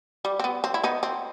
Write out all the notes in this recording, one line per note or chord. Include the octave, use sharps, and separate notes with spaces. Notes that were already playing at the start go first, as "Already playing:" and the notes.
G3
C4
B3
C4
E4
B3 D#4
C4